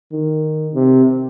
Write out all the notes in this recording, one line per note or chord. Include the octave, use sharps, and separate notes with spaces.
D#3
C3